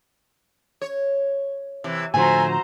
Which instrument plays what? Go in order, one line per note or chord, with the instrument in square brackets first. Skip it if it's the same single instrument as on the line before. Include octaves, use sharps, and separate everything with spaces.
[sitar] C#5
C3 E3
[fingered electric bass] A2 D3 F3 [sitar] A3 [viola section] F#4 C5 A#5 [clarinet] G#5